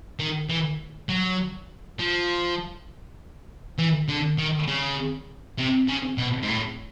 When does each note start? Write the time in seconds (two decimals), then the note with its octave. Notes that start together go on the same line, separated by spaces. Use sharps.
0.19 D#3
0.49 E3
1.09 F#3
1.99 F3
3.78 E3
4.09 D3
4.38 D#3
4.68 C#3
5.58 C3
5.88 C#3
6.18 B2
6.43 G#2
6.48 A2